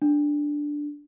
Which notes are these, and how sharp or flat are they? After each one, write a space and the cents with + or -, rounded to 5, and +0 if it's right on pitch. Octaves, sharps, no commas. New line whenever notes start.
D4 +0